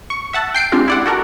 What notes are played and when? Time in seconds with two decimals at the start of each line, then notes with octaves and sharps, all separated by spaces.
0.10 C#6
0.33 E5 F#5 A5
0.54 G5 C7 D7
0.72 G#3 C4 D4 F4 G4
0.88 E4 D5 F#5
1.06 F#4 A4 A#4